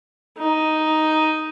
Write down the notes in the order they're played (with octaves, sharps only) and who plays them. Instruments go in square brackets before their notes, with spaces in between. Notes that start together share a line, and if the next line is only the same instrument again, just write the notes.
[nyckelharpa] D#4